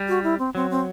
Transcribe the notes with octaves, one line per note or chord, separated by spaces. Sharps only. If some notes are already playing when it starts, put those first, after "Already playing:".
Already playing: G3
F#4
E4
C4
F#3 C4
C4